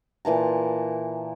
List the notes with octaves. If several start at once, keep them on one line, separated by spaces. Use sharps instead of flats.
A#2 E3 A5 A#5